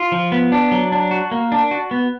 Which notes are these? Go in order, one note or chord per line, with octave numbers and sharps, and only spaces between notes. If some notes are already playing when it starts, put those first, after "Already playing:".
Already playing: F4
F3
B3
D4
F#3
D4
F#4
A#3
D4
F#4
B3